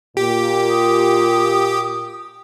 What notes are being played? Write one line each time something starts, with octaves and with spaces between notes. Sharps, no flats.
A#2 G4
D#6